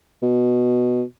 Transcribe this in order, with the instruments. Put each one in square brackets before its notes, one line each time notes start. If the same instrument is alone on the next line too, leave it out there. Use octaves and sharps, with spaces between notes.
[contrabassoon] B2